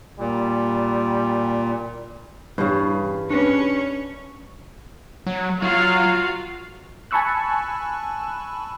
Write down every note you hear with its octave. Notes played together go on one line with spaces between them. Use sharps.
A#2 G3
G2 C#3 E3 G3
C#4 D4 B4
F#3
F#3 F4 F#4 F5
G#5 A5 B5 C#6 E6 F#6